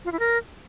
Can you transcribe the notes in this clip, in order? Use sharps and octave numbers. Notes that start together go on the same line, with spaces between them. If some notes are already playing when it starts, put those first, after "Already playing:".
F4
E4
A#4